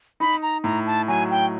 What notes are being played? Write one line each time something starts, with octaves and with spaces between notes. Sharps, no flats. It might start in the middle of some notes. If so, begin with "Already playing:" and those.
D#4 B5
A#5
A2 A#5
A5
F#3 G#5
G5